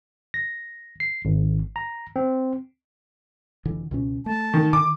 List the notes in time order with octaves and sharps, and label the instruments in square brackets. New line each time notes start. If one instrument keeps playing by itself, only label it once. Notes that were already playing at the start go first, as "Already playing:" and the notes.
[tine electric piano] A#6
C7
G#1
A#5
C4
[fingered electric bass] F1 D3 E3
C#2 B2 C#4
[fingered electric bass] A3 [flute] A5
[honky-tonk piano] D#3
[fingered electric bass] D3 D#3 [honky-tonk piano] D6